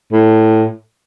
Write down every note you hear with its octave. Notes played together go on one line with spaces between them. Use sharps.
A2